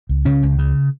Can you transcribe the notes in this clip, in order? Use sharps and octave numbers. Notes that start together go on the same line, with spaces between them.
C#2
C#3 C#4
C#2
C#3